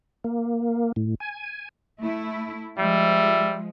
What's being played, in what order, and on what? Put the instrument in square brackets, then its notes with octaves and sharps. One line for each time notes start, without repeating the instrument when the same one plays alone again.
[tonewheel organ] A#3
A2
G#5
[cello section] A3 E4
[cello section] F3 G#3 [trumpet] G3 [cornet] E5